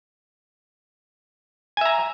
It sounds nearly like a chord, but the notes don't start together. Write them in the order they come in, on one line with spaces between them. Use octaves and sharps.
G#5 E5 A#5